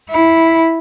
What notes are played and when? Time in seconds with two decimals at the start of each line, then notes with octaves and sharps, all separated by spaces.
0.11 E4